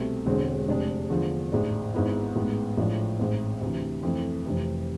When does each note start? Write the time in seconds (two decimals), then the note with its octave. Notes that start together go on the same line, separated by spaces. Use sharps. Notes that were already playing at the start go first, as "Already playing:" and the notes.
Already playing: C2 B2 A3 C4
0.26 E1 E2 D3 G#3 C4
0.68 F1 F2 C3 G#3 D4
1.10 E2 D3 F3
1.52 A1 G#2 G#3 D4
1.94 G#1 G#2 G#3 B3 E4
2.36 A1 G#2 G#3 B3
2.77 A1 A2 F3 G#3 D4
3.19 A1 G#2 G#3 C4
3.61 D2 C3 E3
4.03 F2 E3 A3 C4 E4
4.45 F1 F2 C3 E3